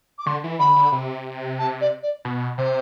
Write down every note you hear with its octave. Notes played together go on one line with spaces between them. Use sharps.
D6
D3 C6
E3
D3 B5
D3
C3
A5
D5
D5
B2
C3 C5